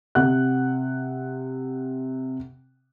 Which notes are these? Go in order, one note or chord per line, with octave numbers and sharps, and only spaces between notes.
C3 F#5 F#6